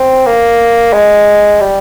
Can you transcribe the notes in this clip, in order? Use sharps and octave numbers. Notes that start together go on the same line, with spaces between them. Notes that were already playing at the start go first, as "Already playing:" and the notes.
Already playing: C4
A#3
G#3
G3